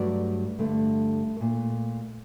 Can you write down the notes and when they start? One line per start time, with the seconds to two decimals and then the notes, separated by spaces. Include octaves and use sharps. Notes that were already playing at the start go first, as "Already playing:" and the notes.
Already playing: G2 F#3 A3 D5
0.59 G2 D3 A3
1.37 A#2 A3